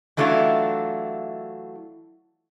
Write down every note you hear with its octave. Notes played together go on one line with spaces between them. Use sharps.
E3 F#3 A3 D4 E4 F4